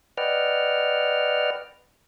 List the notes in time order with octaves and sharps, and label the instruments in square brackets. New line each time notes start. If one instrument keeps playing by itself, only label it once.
[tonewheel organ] B4 D5 D#5 F#5 G5 F6